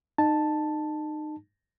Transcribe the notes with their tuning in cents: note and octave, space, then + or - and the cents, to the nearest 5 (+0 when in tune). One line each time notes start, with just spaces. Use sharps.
D#4 -30 A5 +0